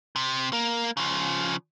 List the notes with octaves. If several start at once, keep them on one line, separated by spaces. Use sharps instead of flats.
C3
A#3
C#3 F3